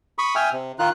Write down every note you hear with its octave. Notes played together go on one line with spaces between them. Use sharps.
B5 C#6 D#6
E5 G5 G#5 D#6 F6
C3
D#3 D#4 F4 F#6